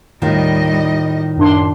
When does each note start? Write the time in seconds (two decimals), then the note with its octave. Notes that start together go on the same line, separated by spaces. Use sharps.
0.22 D#2 A2 D#3 G3 F4 D#5
1.37 F#2 D4 C6